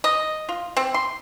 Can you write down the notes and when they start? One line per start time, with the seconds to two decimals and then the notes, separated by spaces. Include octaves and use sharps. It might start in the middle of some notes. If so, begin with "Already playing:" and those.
0.04 D#5
0.49 F4
0.77 C4
0.94 C6